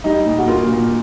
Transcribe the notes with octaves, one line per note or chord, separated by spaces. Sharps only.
G3 D#4
A#2
F#4
A#3 F4
A#2